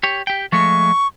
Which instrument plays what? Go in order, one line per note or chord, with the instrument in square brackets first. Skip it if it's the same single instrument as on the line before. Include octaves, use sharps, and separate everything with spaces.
[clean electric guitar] G4 C#5
G4 G5
[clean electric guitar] F3 G#3 A3 [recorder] C#6